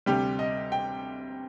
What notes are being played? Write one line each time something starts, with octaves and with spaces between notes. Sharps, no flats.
D2 C3 G3 G4
D#5
G5